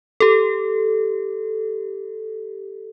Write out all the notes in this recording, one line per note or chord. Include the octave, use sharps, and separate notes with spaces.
G4 A4